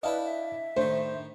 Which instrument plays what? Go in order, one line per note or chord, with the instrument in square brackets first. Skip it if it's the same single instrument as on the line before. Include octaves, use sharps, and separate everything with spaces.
[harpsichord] D4 E4 G5 [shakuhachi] B4 [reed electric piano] D#5 F5 A5
[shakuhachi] E5
[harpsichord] A2 D#3 [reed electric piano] A3 D4 [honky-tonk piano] C5